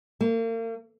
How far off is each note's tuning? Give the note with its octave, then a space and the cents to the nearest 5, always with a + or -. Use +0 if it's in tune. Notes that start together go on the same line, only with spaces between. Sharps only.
A#3 -40